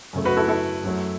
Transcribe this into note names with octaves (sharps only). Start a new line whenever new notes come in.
F#2 C#3 A3
F#4 B4
E4 A4
E4 A4
F#2 F#3 A3